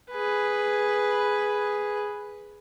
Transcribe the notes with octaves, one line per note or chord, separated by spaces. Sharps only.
G#4 B4